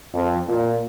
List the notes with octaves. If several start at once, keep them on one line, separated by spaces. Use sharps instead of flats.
F2
A#2